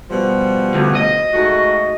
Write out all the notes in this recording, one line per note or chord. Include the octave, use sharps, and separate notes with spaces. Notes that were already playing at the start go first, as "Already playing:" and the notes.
B2 F3 G3
D2
D#5
G#2 A3 F#4